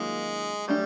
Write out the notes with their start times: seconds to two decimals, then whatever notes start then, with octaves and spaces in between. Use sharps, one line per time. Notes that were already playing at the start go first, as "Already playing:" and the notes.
Already playing: D#3 F#3 G#3 A#3 C#4 F4
0.68 F#3 G3 A3 D4 G4